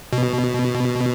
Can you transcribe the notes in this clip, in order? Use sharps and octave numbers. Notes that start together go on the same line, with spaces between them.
B2